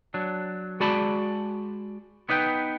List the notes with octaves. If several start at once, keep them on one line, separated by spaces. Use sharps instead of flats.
F#3 D4
G#3 F#4 D5 A5 B5
B3 D#4 B4 F#5 G5